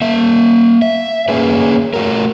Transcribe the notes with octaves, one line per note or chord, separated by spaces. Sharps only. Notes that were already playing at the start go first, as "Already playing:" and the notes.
A#3 E5
E5
A#3 C#4 G#4 B4
A3 F#4 A#4